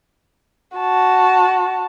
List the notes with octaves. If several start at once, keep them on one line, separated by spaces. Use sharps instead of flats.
F#4 A5